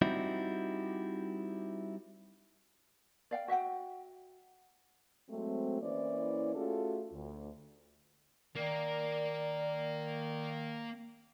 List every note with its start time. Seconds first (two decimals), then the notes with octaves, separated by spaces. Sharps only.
0.02 G3 C4 D#4 E4 F#4
3.31 D5 F5 G5
3.48 F#4 E5 F#5 G5
5.29 F#3 G#3 A3 C4
5.81 E3 A#3 C#4 E4 C5 D5
6.56 A3 C#4 F4 F#4 G#4 A4
7.13 D2
8.56 D#3 A#3 D5